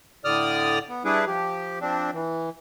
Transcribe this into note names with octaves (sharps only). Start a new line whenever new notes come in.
A2 D3 D5 D#6 F6
B3
G3 D4 E4 G#4 B4
F3 G4
F3 C4 D4
E3